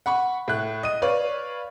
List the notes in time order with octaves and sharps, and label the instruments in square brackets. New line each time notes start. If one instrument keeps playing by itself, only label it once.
[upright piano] F#5 B5 C#6
A2 F#6
D#5 D#7
B4 C#5 D5 F5